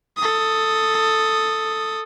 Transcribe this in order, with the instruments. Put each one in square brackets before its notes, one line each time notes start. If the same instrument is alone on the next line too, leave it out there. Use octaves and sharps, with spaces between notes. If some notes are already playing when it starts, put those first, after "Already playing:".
[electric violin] A4 D#6